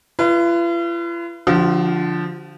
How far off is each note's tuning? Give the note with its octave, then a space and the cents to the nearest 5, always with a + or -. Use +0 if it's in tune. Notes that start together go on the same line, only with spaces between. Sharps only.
F4 -45 B4 +0
D3 +0 F3 +0 F#4 +45